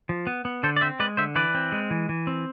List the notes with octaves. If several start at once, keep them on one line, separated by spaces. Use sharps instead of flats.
F3
B3
B3
D3 A4 C5
D5
C4 C5 E5
G#3 B4 D5
D3 C5 E5
E3 B4 D5
C4
G#3
E3
E3
C4